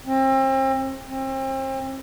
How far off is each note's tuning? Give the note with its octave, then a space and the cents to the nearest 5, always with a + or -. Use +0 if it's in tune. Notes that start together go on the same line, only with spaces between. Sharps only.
C4 +35
C4 +35